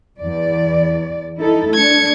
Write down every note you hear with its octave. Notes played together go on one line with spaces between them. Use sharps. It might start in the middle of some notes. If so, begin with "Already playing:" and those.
E2 D5
D#4 E4 A4
A3 D4 G#6 C#7